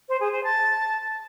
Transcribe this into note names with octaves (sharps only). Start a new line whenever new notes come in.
C5
G#4
C5
A5